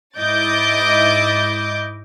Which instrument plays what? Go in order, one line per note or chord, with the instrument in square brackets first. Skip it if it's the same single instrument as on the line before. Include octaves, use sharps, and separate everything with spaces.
[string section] G#2 E4 D#5 D6 G6 A6